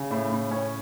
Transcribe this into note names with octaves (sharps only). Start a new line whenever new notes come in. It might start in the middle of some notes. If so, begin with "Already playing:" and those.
Already playing: C#3
A2
A2
C#4